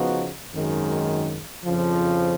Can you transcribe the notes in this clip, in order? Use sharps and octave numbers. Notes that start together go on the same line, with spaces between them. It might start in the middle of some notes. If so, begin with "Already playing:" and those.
Already playing: C#3 F3 B3 D#4 F#4
G#1 F#2 D#3 G#3
F2 C#3 F3